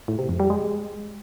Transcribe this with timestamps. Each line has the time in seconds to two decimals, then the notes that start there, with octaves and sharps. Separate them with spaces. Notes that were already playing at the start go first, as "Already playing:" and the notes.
0.08 A2
0.19 C3
0.29 F2
0.40 G3
0.50 G#3